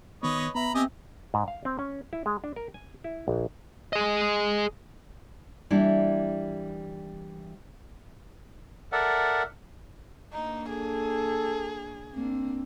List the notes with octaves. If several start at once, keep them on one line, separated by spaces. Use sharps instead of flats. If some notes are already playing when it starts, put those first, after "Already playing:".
D#3 B3 B4 C#5 D#5
B3 E5 A#5 B5
C4 G4 D#5 G#5
G#2
F5
C4
C#4
E4
G#3
D4
A#4
G#5
E4
A#1
G#4 D#5
E3 G3 A#3 D4 E4
A4 A#4 D5 E5 F#5
A#3 D4 D#4
G#4 A4
A#3 C4 D4